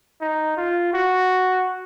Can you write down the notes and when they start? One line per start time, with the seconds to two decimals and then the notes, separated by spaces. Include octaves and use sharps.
0.21 D#4
0.57 F4
0.93 F#4